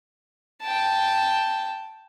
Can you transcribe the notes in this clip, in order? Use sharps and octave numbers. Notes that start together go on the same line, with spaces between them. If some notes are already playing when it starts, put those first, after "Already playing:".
G5 A5